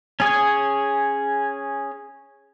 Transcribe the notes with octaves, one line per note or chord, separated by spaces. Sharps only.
C#4 G#4 C#5